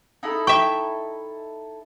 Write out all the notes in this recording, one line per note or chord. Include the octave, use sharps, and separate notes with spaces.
D#4 E4 A4
E5 G5 C#6